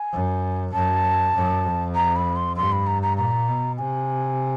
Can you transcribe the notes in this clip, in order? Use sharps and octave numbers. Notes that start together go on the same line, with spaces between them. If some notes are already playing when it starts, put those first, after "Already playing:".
Already playing: G#5
F#2
F#2 A5
F#2
F2
A#5
B5
C6
G2 C6
B5
A#5
A#5
A#2 A#5
B2
C3 G#5